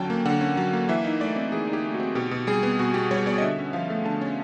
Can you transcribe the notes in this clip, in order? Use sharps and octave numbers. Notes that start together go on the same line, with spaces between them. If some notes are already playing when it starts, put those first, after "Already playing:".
Already playing: D3 F#3 C#4 G5 A5
A#3
D3 F#5
C#4
F#3
A#3
E3 E5
D#4
A3 D5
C4
E3 G#4
D#4
G4
A3
F#4
C4
B2 G4
B2
G3 G#4
B3
B2 F#4
B2 G4
G3 C#5
B3 D5
D#5
D3 E5
C#4
F3 F5
A3
D3 A5
C#4